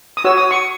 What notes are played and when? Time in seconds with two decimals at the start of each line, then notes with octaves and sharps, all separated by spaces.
0.17 D#6
0.24 F#4 C#5 E6
0.38 D#6
0.51 C#6